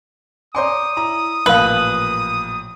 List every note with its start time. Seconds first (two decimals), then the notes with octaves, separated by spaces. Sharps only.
0.55 C#5 D5 G#5 A#5 C6 D6 D#6
0.97 E4 A#5
1.46 A1 A#2 F3 A#4 B4 F5